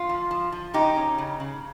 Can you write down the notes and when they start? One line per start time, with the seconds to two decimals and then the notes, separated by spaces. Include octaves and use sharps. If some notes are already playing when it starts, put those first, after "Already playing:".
Already playing: F4
0.09 F3
0.31 F3
0.52 F3
0.74 C#3 D#4 G4
0.96 C#4
1.18 C#3
1.40 C#3